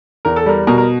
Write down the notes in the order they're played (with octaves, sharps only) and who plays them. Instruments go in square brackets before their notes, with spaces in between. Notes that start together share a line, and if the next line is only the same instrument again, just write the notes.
[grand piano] E2 A#4
A4
G3 A#4
B2 A#4
A#4